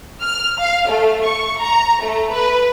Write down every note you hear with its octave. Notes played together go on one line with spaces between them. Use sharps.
F6
F5
A3
C#6
A#5
A3
B4